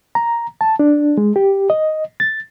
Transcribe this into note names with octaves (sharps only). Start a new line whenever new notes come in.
A#5
A5
D4
G#3
G4
D#5
A6